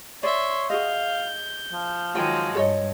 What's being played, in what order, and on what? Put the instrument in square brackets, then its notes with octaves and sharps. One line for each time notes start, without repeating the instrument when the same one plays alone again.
[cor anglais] C#5 [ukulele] D5 [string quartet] E5 C6
[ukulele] F#4 G#4 D#5 [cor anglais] F5 [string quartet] G6
[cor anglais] F3
[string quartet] D#3 F#3 G#3 [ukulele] F4 G5
[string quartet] G2 [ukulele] A4 C#5 D#5